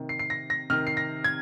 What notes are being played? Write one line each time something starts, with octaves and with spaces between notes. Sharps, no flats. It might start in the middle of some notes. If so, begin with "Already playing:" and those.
Already playing: C3 D#3
C7
C7
A#6
A#6
C3 D#3 F6
C7
A#6
G#6